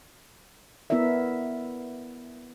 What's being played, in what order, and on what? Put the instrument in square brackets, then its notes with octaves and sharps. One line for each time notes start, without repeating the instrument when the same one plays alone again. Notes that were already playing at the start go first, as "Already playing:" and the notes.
[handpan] B3 E4 A#4 D5 E5